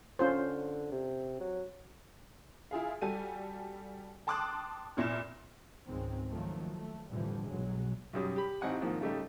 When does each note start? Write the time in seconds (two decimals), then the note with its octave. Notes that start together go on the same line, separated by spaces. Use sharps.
0.19 D3 C#4 F4 C5
0.91 C3
1.40 F#3
2.71 E4 F4 G#4 F5
3.01 G3 F#4 A4 G#5 D#7
4.27 G5 A5 C6 D6 D#6 F#6
4.97 F1 A#2 E4 A#6 E7
5.86 C#2 G#2 D#3 G#3 C4
6.31 D#3 F3 F#3 A3 A#3
6.75 A3
7.10 F2 A2 D3 E3 F3 G3
7.45 B1 G2 F#3 G#3
8.13 B1 F#2 G3 D#6
8.36 G4 B5
8.61 A1 C4 D#4 F#5 G#5
8.81 G#2 D#3 F3 A#3
9.01 C#3 G3 A3 D#4 G4